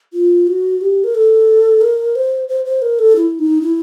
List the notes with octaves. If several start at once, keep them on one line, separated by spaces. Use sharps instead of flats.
F4
F#4
G4
A#4
A4
A#4
C5
C5
C5
A#4
A4
E4
D#4
E4